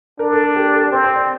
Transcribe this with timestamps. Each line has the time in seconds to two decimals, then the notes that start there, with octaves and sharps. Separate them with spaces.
0.19 D4 A#4
0.32 A4
0.43 A4
0.56 G4
0.73 A4
0.92 C4 C5
1.04 C5
1.16 D5